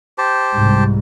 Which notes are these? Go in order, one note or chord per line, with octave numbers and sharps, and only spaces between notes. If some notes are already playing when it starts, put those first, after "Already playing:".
G4 C5 A5
C2 G#2